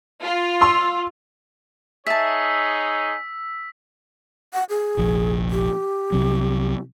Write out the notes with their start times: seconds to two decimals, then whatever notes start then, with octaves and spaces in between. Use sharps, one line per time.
0.22 F4
0.61 C6 E6
2.07 D#4 G#4 C#5 E5 A5 E6 B6
4.53 F#5
4.70 G#4
4.97 F1 A#1 F3
5.51 G4
6.12 C2 C3 F#3